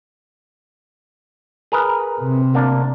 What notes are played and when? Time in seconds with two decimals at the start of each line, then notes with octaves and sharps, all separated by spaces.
1.72 G#4 A#4 B4
2.21 C3
2.54 D2 A#3 D4